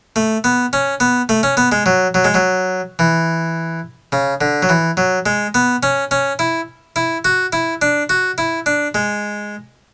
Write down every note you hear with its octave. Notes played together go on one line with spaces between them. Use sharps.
A3
B3
C#4
B3
A3
C#4
B3
G#3
F#3
F#3
G#3
F#3
E3
C#3
D3
F#3
E3
F#3
G#3
B3
C#4
C#4
E4
E4
F#4
E4
D4
F#4
E4
D4
G#3